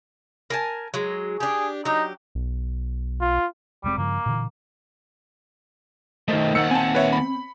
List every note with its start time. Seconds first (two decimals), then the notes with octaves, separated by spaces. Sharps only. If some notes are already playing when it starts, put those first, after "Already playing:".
0.50 A#4 G#5 A5
0.94 F#3 G#3
1.40 D4 G4 G#4
1.85 F#3 D#4 G4
2.35 B1
3.21 F4
3.84 F1 G3 G#3 C4
3.98 G2 C#3 F3 A#3
4.26 A#2 D3 E3
6.28 D#3 A3 A#4 C5 D#5
6.55 D#2 D#3 F#5 E6 C#7
6.71 C4 G#5 A5
6.95 B4 C#5 E5
7.13 B5